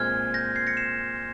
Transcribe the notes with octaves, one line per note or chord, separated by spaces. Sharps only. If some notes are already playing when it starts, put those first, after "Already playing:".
Already playing: A#2 G#3 C4 F6 G#6
G6 A#6
G#6 C7
A#6 C#7
C7 E7